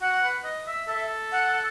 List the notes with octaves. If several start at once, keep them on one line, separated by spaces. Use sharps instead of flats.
F#4 F#5
B4
D#5
E5
A4 E5
F#5